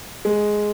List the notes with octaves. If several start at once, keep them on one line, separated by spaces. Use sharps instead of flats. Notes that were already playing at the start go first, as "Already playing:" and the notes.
G#3